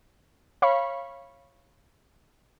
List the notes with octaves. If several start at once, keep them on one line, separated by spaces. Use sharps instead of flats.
C#5 F5 B5 C#6